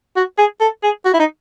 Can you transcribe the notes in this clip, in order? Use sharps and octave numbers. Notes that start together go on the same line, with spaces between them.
F#4
G#4
A4
G#4
F#4
E4
D#4